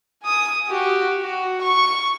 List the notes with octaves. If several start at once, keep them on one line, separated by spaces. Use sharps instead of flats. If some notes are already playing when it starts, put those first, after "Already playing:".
G#5 D#6
F#4 G4
F#4
C#6